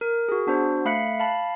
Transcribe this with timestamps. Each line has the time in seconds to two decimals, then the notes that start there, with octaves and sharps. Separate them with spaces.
0.01 A#4
0.29 F#4 G#4
0.47 B3 D4 F#4 C5
0.85 A3 F5 B5 F#6 B6 C#7
1.20 F5 A5 B5